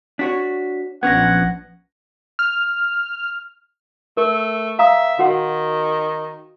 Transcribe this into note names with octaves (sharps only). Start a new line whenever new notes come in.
D4 F#4 C#5 B6
A#1 F3 B3 C#4 D4 F#5 G#6 A#6
F6
A3 A#4
E5 F5 A#5 D#6
D#3 F#4 F#5